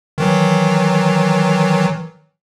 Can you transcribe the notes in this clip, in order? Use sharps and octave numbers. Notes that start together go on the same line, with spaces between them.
D#3 E3 F#3